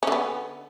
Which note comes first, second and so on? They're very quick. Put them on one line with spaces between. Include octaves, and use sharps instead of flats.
C#4 D3 B3